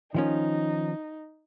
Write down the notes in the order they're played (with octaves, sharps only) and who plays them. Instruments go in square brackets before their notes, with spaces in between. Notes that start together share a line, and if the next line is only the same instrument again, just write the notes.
[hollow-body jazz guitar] D#3 F3 C#4 [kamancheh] D#4